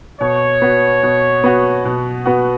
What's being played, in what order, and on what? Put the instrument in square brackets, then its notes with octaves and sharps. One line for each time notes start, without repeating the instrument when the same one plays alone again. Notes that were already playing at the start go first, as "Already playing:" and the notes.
[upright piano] B2 [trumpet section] C#5
[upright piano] B3 F#4
B2
B3 F#4
B2
B3 F#4